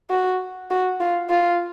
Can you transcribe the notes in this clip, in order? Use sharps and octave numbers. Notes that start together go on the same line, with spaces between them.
F#4
F#4
F4
F4